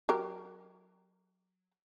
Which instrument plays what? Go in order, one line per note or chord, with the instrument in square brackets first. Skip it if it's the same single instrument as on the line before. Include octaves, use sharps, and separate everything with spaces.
[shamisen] F#3 G4 A#4